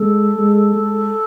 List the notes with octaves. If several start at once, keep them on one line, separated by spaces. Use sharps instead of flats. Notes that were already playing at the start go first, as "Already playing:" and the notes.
Already playing: G#3 A4
G#3
G#3